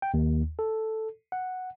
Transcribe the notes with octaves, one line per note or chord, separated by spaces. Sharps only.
G5
D#2
A4
F#5